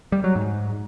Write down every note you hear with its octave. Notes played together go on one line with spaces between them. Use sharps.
G3
F#3
G#2